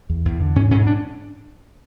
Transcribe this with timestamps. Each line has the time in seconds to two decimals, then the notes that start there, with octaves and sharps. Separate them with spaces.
0.10 E2
0.25 E2
0.40 D3
0.56 G#2 C#4
0.71 G#2 C#4
0.87 D4